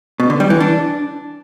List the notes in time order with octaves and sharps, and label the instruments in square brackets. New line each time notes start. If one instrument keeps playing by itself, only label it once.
[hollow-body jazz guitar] B2
D3
G3
E3
D4